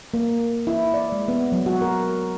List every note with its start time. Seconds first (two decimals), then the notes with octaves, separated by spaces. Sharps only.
0.14 A#3
0.67 E4
0.94 D5
1.12 G#3
1.28 B3
1.52 F#3
1.66 F#4
1.81 A#4